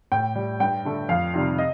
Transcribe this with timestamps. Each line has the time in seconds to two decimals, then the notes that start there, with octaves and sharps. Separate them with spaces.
0.12 A2 G5
0.36 G3
0.60 G2 G5
0.85 D3 A3
1.09 F2 F5
1.34 C3 D#3 G3
1.58 D#5